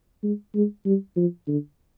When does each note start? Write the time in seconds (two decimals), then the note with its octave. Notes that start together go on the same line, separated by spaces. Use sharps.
0.23 G#3
0.55 G#3
0.86 G3
1.17 F3
1.47 D3